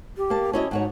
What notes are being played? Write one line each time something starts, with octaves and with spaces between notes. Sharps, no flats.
G4
A#3 A5
C#4 E4 F#4 D#5
G#2 D#4 F#4 C#5